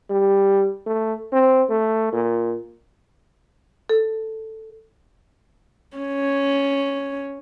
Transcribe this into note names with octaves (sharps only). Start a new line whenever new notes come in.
G3
A3
C4
A3
A#2
A4
C#4